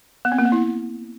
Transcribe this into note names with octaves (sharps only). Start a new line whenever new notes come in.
B3
C4
A#3
B3
E4